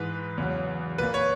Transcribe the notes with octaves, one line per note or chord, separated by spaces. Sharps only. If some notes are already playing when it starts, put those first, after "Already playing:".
Already playing: G#2 E3 G#3 B4
E2 C#3 F#3
A#2 A#3 B4
C#5